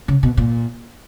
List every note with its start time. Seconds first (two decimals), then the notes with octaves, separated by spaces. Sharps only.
0.08 C#3
0.23 B2
0.37 A#2